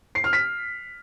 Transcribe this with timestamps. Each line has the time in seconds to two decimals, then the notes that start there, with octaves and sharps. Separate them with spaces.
0.15 C7
0.24 F6
0.33 B6